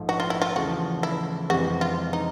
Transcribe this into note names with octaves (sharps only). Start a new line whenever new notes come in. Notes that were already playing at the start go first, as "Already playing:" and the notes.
Already playing: A#1 G#2 F3 A3
F#4
F4
E4
F4
E2 C#3 F3 A3 F#4
E4
F2 C3 E3 G#3 C4 F#4
F4
D#4